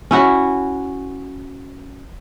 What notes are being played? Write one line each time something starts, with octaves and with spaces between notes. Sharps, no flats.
C#4 E4 F#4